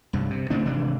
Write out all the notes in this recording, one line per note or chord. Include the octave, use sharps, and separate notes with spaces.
C2 G2
C3
C#3 A3 C4 D4
G#1 C3 E3 D4